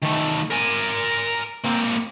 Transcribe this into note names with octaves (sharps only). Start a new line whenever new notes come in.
D#3 A3
A#4 G#5
A#3 C4